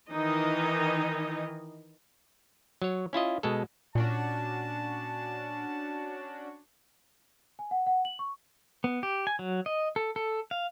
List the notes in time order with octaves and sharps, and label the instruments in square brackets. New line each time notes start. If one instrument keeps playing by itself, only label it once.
[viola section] D#3 E3 D#4 D#5
[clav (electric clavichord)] F#3 C#5
C#4 E4 F4 D#5
B2 G#3 A4
[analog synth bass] A#2 [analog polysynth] C#4 D4 F#4 [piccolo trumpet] A5
[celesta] G#5
F#5
F#5
F#7
C#6
[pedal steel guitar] B3
G4
G#5
F#3
D#5
A4
A4
F5